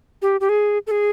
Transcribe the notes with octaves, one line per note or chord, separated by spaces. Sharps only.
G4
G4
G#4
A4
G#4